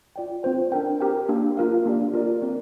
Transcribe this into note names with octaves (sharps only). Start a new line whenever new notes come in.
F4 D5 G5
C4 F4 C5 G5
D4 A#4 G5
G4 A#4 G5
A#3 D4 G4
F4 A#4 F5
A#3 D4 G4 D5
F4 A#4 D5
C4 A#4 D5